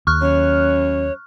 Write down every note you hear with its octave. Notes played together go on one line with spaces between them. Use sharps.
D#2 C#6 F6 F#6
F#2 C#5